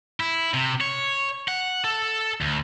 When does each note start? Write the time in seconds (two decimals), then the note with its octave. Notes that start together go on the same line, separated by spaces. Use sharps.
0.20 E4
0.54 C3
0.81 C#5
1.48 F#5
1.84 A4
2.41 D2